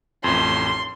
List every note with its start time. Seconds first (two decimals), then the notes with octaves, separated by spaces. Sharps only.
0.24 A1 F2 C6